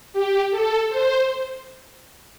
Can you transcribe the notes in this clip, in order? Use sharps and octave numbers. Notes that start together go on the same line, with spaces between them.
G4
A4
C5